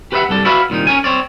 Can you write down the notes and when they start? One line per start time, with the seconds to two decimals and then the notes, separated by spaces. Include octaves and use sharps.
0.12 G4 B4 C5 D#5 E5 F#5
0.29 C2 G2 A4 D5
0.45 E4 F#4 B4 D5 E5 F5
0.70 C2 A#2 D#3 D#4
0.87 C#4 A#4 G#5
1.04 C4 C#5 D5